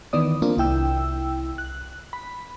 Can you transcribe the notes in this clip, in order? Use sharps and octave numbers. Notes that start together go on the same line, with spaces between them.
D#3 E3 B3 D5 D#6
A#3 C4 D4 F4
C2 E4 G5 E6
F#6
B5